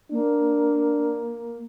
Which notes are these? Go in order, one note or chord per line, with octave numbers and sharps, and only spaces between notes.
A#3 D4